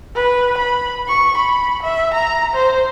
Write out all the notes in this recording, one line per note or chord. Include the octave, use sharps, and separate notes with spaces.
B4
B5
C#6
B5
E5
A#5
C5